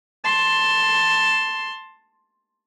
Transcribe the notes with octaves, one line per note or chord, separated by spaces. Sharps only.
A5 C6